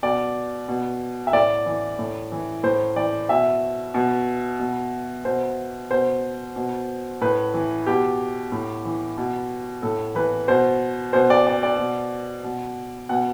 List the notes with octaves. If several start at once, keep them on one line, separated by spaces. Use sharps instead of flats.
B2 D5
B2
E5
A2 D5
E3
A2
E3
A2 C5
E3 D5
B2 E5
B2
B2
B2 C5
B2 C5
B2
A2 B4
E3
B2 G4
A2
E3
B2
A2 A4
E3 B4
B2 C5
B2 C5
D5
D5
D5
B2
B2
B2 F#5